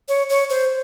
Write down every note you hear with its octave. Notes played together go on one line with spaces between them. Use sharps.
C#5
C#5
C5